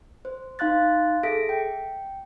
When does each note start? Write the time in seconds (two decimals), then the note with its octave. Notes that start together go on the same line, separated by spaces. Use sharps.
0.25 C5
0.59 D#4 F5 C6 F#6 A6
1.23 G#4 A4 E5 A#6 B6 D7
1.49 G5